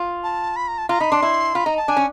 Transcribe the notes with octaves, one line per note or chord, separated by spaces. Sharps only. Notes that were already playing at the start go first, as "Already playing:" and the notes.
Already playing: F4
A5
B5
A#5
A5
F4 A#5
D#4 B5
D4 C6
E4
F4 B5
D#4 A#5
A5
D4 G#5
C#4